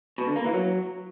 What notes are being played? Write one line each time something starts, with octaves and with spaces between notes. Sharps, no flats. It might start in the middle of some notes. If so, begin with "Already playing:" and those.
B2
D3
A#3
E3
F#3